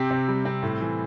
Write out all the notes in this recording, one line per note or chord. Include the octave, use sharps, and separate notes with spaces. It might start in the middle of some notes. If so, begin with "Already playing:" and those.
Already playing: C3 C4 G4
C3
G3
C4
A2
E3